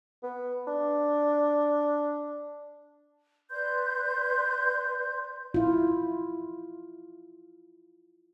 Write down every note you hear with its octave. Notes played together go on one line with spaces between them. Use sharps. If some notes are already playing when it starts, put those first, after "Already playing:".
B3
D4
B4 D5 C6 G6
E4 F4